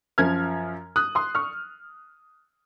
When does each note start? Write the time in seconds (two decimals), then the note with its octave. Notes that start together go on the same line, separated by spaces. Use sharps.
0.18 F#2 F3 F6 G#6
0.96 D#6 F#6
1.15 C6 D#6
1.35 C#6 F6